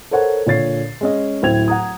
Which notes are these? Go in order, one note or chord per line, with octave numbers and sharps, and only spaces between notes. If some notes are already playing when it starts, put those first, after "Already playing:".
A4 A#4 C5 C#5 F#5
A#2 D3 C#5 A6 C7
G#3 C#4 D#5
D1 E4 C5 G5 G#6 F7
F#5 A#5 D#6